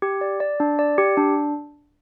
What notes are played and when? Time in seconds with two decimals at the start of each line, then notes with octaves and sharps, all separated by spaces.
0.02 G4
0.21 D5
0.40 D5
0.60 D4
0.79 D5
0.98 G4
1.17 D4